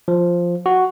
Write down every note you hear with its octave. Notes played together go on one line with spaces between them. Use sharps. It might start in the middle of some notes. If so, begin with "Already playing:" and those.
F3
F#4